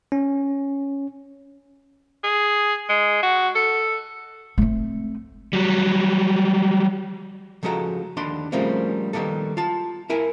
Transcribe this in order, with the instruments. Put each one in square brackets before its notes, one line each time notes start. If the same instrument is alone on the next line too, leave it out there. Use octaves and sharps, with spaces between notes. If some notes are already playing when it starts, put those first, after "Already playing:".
[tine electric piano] C#4
[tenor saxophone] G#4
G#3
F#4
A4
[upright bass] A3 C4
[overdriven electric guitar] F#3 G3
[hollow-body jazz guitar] C#3 F3 G#3 F#4 A4 A#5
D#2 D3 D4 B5 C6
C#3 F3 G3 A3 A#3 C4
D#3 G3 A#3 B3 A4
F4 A5
E4 A#4 G#5